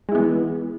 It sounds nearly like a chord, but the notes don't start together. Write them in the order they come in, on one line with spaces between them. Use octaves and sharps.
G#3 E4 B3 E3